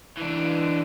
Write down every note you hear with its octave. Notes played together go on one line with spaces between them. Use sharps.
E3 D4